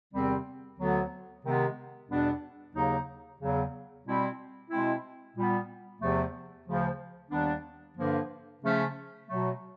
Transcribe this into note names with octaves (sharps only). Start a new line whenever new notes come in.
E2 C3 D#3 G3 C4
D2 D3 F#3 B3
C3 D#3 G#3 B3
E2 B2 G3 B3 D4
D#2 C#3 F#3 A#3 D#4
E2 C#3 F#3
B2 G3 C4 E4
B2 G#3 C4 E4
A#2 G3 B3
E2 C3 F3 A3
D2 C#3 F3
D#2 D#3 G3 B3 D4
G2 D3 F3 A#3
C#3 F3 A3 C#4
B2 F#3 A3